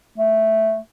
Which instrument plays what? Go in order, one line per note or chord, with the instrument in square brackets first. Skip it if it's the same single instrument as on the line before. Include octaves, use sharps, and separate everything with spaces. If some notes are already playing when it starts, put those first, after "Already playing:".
[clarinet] A3